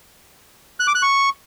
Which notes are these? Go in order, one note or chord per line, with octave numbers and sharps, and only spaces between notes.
F#6
D6
F#6
C#6